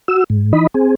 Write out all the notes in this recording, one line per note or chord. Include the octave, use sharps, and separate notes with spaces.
F#4 E6
G#2
E3 D#4 D#5 B5
C4 G#4